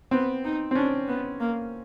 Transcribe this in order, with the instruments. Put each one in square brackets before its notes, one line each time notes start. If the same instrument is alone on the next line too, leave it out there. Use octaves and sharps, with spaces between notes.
[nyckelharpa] B3 [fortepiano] C4
[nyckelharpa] D#4
[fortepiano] C4
[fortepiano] C#4 [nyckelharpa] D4
[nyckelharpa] B3
A#3